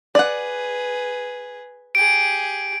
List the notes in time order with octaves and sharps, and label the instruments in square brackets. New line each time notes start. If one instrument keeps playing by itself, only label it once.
[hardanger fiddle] G#4 B4 [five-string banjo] D5 F#5
[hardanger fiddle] G4 G#4 [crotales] D7